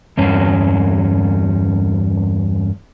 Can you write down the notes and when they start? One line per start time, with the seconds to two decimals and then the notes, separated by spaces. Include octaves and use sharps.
0.17 E2 G2 C#4